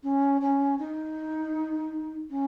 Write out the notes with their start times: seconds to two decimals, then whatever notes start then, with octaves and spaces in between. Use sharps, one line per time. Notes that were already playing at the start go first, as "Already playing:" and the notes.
0.03 C#4
0.42 C#4
0.79 D#4
2.30 C#4